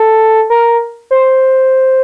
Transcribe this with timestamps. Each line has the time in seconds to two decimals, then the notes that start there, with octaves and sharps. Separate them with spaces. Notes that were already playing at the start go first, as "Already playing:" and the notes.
Already playing: A4
0.50 A#4
1.11 C5